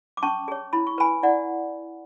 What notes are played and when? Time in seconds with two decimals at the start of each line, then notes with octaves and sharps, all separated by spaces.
0.17 D6
0.23 C#4 A5 C#6
0.48 G#4 C#5
0.73 E4 B5
0.87 C#6
0.98 B4 G#5 B5
1.23 E4 D5 F#5